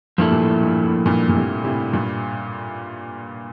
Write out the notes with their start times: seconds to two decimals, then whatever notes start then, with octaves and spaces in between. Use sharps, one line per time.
0.18 G2 A#2 F3 A#3 E4 A4
0.32 A#2
0.40 A2
0.62 G2
0.84 A2
1.05 G2 A#2
1.29 A#2
1.35 A2 C3
1.64 A2 C3
1.93 G2 A#2